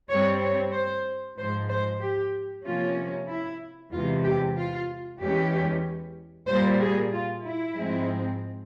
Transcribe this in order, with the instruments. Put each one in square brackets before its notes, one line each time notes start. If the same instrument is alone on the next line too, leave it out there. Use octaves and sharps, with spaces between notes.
[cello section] G2 G3 C4 C#5
C#5
C5
G#2 F3 G#3 C5
C5
G4
C3 F3 A#3 C#4 F4
E4
E2 C3 E3 G#3 F4
G4
F4
E2 E3 G#3 C#4 G4
A#2 G3 A#3 C5
G#4
F4
E4
G#2 F3 G#3 C4